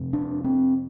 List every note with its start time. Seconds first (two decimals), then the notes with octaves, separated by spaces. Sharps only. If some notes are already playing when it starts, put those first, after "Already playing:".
Already playing: F2 C3
0.13 D4
0.44 C4